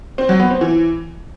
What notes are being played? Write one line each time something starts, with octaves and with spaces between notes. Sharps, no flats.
C4
F#3
B3
C4
E3